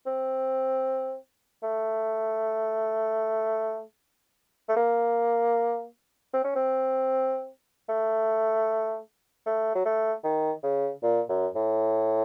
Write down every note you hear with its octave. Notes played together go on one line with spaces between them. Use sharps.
C4
A3
A3
A#3
C4
C#4
C4
A3
A3
F#3
A3
D#3
C#3
A#2
F#2
A2